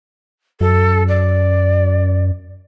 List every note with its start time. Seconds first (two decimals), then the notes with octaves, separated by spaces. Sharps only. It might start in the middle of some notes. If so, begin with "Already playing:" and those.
0.61 F#2 A4
1.08 D5